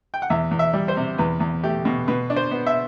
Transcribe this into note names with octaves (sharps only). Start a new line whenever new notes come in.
G5
F#5
E2 E5
E2
E5
G3
C5
C3
E2 B4
E2
A3 G4
B2
B2 B4
D4
C5
B3
E5